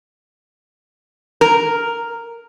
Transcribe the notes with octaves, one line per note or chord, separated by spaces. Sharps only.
A#4